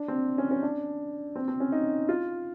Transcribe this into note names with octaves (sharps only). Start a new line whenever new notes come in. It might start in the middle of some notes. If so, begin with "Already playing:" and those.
Already playing: D4
C4
C#4
C#4
D4
C4
C4
C#4
D#4
F4